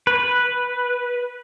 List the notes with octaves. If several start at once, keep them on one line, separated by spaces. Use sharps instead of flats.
B4